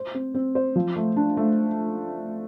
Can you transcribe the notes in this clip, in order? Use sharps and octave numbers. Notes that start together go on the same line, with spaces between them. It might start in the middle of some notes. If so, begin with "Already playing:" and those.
Already playing: C5
C4
C4
C5
F3
A3
D4
A3